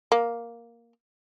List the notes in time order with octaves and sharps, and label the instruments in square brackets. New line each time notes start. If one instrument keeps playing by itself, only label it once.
[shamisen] A#3